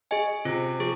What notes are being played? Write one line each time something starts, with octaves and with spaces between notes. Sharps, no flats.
G#4 D#5 G#5
C3 F4
F3 G#4